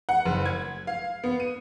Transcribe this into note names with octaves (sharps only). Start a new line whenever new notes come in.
F#5
F#1
G#6
F5
B3
D#7